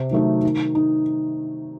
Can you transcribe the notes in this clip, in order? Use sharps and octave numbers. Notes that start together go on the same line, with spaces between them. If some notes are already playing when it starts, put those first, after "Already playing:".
Already playing: C3
D#3 F#3 A3 D#4
D#3
D#4